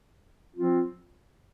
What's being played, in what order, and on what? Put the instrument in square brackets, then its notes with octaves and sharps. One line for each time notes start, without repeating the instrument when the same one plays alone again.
[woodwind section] F3 C4 F4